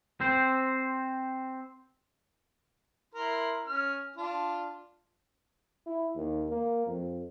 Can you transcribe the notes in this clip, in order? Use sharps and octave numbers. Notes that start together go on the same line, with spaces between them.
C4 C5
E4 A#4 C6
C#4 F6
D4 F4
E4
D#2
A#3
F2